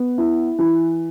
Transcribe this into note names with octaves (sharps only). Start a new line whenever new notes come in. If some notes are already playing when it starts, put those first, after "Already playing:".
Already playing: B3
E4
E3